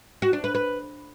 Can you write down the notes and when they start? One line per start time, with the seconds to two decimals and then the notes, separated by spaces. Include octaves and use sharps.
0.22 F#4
0.33 D4
0.44 B4
0.55 B4